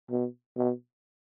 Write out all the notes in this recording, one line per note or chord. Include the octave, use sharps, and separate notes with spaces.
B2
B2